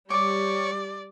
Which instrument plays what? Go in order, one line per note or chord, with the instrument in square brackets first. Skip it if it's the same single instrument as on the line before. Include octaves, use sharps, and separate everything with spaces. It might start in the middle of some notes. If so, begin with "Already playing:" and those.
[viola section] G3 [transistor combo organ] C#5 [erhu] D5 [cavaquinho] D6